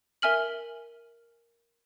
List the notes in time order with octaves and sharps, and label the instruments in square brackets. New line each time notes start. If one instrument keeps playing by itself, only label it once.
[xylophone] A#4 E5 G#5 F6 F#7